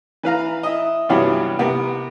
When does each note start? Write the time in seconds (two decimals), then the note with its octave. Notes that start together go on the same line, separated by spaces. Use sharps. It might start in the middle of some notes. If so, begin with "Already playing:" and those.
0.23 E3 B4 F5 A#5
0.63 E4 D#5
1.09 G2 C3 E3 F#3 B3 F4
1.59 C3 B3 A#4